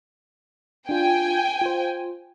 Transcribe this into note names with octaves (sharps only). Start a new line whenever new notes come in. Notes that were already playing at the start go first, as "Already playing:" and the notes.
D4 F4 G5 G#5
F4 C5